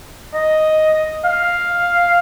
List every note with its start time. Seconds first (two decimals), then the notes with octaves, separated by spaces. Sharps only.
0.34 D#5
1.24 F5